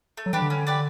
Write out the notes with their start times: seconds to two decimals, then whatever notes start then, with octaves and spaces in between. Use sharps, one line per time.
0.17 A3
0.26 F#3
0.33 E3 D4 G4 B4
0.42 D3
0.50 C#4
0.67 G4 B4 D5